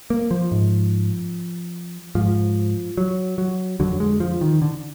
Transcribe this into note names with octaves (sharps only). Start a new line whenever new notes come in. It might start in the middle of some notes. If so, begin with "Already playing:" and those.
A#3
F3
G#2
G#2 F3
F#3
F#3
F2 D3 F#3
G#3
F3
D#3
D3